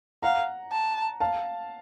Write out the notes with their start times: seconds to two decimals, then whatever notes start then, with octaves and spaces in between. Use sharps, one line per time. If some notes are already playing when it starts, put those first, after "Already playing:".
0.22 F5 F#5 A#5
0.72 A5
1.20 F5 A5